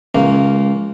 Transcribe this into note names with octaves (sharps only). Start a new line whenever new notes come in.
C#2 A#3